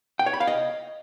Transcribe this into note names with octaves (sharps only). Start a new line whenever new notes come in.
G5
C#5
B5
F5
D#5